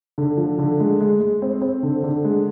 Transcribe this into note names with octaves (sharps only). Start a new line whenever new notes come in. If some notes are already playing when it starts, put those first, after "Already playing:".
D3
F3
D3
G#3
G#3
G#3
C4
C4
D3
D3
G#3